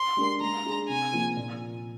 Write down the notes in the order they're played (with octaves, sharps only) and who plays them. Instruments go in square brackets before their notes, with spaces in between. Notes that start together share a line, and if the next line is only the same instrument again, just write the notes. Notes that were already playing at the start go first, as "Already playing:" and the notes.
Already playing: [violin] C6
[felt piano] G#3 D4 G4 A#4
[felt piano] G#3 [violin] A#5
[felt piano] D4 G#4
[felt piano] C3 [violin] G#5
[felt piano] F3 A#3 F4
A#2